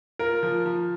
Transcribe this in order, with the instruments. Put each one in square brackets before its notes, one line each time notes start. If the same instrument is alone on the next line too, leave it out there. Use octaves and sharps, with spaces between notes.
[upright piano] F4 [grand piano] A#4
[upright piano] F3
F3